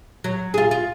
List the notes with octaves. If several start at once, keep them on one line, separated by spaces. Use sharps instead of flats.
F#3
F4 G#4
F4